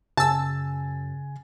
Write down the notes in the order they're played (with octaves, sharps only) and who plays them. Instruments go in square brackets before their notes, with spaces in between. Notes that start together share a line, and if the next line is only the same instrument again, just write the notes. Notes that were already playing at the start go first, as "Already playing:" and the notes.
[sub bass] F#2 [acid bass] C#3 [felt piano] G#5 A6 [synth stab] A5 E6